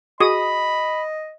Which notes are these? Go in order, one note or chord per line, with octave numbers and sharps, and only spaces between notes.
F#4 G#4 D#5 B5 D#6